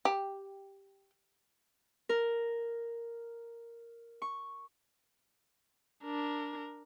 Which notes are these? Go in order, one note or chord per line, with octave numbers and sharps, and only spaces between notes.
G4
A#4
C#6
D4 A#4